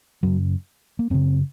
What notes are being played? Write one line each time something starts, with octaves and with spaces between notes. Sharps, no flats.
F#2 C#3 F#3
A#3
F#2 C#3 C4